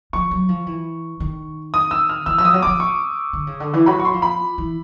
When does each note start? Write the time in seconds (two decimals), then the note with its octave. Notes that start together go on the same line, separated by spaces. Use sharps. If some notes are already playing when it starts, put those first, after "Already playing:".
0.13 F3 C#6
0.31 F#3
0.49 F3
0.67 E3
1.20 D#3
1.74 D#6
1.91 E6
2.09 F6
2.26 E3 E6
2.38 F3 E6
2.45 D#6
2.53 F#3
2.62 F3 D6
2.80 C#6
3.33 D3
3.47 C#3
3.60 D3
3.73 E3
3.86 F#3 B5
4.00 C#6
4.05 C6
4.14 F3
4.22 B5
4.58 E3